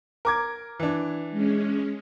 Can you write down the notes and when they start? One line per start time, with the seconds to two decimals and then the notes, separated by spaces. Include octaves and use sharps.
0.25 A#4 D6 G#6
0.80 E3 D4
1.31 G#3 C#4